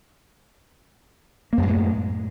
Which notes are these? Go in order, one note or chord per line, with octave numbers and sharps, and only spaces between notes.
F#2 A2 G#3 A#3